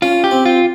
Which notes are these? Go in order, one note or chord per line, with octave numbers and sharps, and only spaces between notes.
C#4 F4
G4
C4
F4